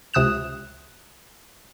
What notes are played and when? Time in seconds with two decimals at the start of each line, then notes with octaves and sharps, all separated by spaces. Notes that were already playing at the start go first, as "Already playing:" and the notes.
0.14 C#2 C3 D#6 F#6 E7